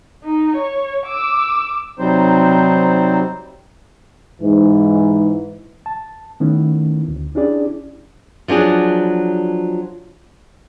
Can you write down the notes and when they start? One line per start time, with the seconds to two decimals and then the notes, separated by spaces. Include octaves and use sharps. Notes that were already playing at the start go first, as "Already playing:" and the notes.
0.24 D#4
0.56 C#5
1.06 D6 E6
1.99 C3 F#3 G3 C4 D#4 C5
4.42 G#2 E3
5.86 A5
6.40 D#3 A3 B3 C#4 E4
7.08 D2
7.35 C#4 D4 E4 G4 G#4 D5
8.48 F3 F#3 D4 G#4 D5